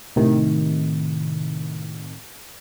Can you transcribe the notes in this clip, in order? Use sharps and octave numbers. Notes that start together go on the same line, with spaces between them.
A2 C3 D#3